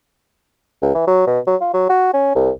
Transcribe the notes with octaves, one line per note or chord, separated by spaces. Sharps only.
C#2
E3
F#3
B2
F#3
F4
F#3
F#4
C#4
C2